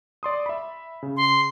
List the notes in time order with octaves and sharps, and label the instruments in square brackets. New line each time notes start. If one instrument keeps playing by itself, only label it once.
[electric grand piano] D5 C6 D#6
E5 B5
C#3
[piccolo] C6